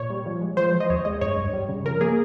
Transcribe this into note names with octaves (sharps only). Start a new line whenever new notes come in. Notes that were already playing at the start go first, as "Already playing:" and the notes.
Already playing: A#2 C#5
G3
F3
G#3
F3 C5
F3
D#5
D#2 C#5
G#3 D#5
G2 C#5
G2
G3
C#3
F3 A#4
A#3 G#4